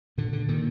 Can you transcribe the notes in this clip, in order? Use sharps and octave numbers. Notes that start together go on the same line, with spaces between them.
A#2 D3
D3
A#2 D#3